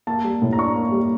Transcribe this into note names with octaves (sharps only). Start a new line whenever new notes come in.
A#3 A5
G3
A2
A#5
D4 C#6
A#3
G3